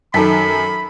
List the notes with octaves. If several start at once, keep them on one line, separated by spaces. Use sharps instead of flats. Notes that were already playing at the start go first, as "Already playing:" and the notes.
F#2 D#3 A4 A5 B5 B6